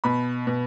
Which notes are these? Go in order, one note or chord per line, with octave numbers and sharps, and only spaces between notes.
B2 B5
B2